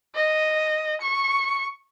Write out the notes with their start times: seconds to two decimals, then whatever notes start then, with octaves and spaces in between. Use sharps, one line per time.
0.15 D#5
1.01 C#6